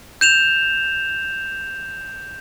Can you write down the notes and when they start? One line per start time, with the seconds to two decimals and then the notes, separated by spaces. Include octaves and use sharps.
0.21 G6 E7 F7